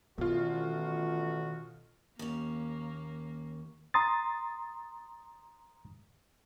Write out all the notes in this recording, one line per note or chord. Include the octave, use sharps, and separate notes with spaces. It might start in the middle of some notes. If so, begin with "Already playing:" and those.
A1 B2 D#3 F4 F#4
D#2 A#3 C#4
A#5 C6 D#6 A6